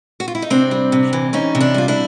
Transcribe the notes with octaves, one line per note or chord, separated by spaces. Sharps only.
F#4
F4
E4
D#4
C3 C4 D4
G3
C3
E3
C3 C#4 D#4
C3
D4 E4
G3 F4
D4 E4